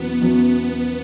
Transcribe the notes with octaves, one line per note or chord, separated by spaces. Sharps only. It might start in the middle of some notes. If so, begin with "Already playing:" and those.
Already playing: E2 B2 F#3 B3 C#4
E2 B2 F#3 C#4